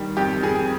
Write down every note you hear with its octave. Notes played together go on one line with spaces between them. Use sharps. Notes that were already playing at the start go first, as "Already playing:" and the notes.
Already playing: D#3 G3
F2 G4
F2 G#4